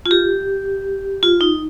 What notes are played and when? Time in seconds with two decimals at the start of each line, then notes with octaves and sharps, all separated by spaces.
0.06 F4
0.11 G4
1.23 F4
1.41 D#4